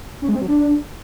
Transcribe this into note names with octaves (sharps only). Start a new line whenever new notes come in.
C#4
G#3
C4
F#3
D4